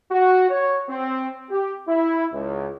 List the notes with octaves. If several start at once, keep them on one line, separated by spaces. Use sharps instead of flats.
F#4
C#5
C4
G4
E4
C#2